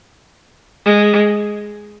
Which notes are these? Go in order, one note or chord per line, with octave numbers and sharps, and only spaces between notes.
G#3